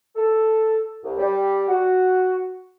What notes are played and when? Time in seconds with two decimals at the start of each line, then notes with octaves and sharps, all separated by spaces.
0.16 A4
1.03 C2
1.18 G3
1.68 F#4